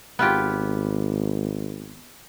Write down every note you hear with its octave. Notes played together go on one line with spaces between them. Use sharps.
G#1 B3 F4 G4